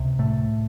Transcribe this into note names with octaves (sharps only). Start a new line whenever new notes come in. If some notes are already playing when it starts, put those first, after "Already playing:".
Already playing: C#2 C3
A2 A3